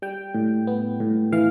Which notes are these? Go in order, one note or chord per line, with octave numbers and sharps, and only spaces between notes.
G3 G5
A2
B3
A2
E3 F5